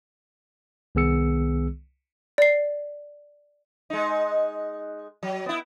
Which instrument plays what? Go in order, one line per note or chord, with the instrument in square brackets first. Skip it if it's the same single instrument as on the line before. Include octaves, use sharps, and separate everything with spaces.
[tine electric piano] C2 D#3 B3 G#4 E6 C#7
[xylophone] D5 C7
[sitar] G#3 D#4
F#3
B3 E4